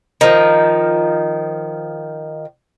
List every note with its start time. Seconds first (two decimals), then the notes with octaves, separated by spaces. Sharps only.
0.21 D#3 F3